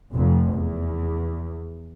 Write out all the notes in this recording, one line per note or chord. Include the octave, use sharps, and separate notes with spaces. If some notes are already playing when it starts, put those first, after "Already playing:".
F1 F2
E2